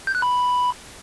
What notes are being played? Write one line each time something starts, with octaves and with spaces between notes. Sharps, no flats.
G6
F#6
B5